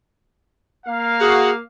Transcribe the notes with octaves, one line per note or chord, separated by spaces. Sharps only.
A#3 F5
F#4 G#4